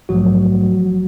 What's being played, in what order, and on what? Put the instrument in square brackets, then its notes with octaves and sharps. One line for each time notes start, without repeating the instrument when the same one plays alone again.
[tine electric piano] A#1 G#2 F3 F#3 A3 F#4